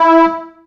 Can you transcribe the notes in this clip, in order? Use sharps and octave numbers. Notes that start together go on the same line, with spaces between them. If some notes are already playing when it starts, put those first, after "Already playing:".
Already playing: E4